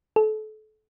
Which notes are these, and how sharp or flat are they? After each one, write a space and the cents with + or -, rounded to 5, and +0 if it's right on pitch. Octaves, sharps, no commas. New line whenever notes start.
A4 -30